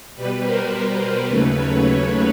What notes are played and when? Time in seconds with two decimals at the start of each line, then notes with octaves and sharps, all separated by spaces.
0.15 B2 G3 B4
0.43 A#4 C5
0.72 B4
1.27 D#2 C#3 F#3 A3 B4
1.55 B4 C#5